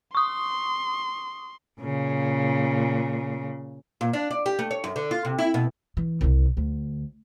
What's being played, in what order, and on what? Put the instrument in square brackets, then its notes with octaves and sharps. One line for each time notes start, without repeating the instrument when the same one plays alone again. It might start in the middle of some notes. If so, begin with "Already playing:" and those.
[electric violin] C6 [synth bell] C#6 D#6
[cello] A#2 C#3
[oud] A#2
D4
D5
G4
A3
C#5
F#2
D3
F4
C3
E4
B2
[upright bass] E3
C2 C3
D2